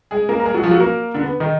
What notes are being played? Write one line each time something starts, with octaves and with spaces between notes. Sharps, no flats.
G#3 G#4
A#3 A#4
A#4
G#3 G#4
F#3 F#4
F3 F4
F#3 F#4
A#3 A#4
D3 D4
B3
D#3 D#4